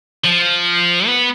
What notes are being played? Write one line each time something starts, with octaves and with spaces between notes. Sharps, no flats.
F3
B3